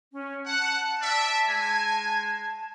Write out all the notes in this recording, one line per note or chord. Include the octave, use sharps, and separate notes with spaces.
C#4
F#5 A5
D5 E5
G#3 G#5